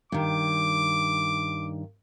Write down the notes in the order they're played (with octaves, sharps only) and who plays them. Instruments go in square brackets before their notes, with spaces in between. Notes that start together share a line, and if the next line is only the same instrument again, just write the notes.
[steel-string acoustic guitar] G2 D#3 [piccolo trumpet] D6